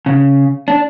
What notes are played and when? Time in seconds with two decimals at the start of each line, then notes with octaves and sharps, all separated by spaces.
0.06 C#3
0.68 D4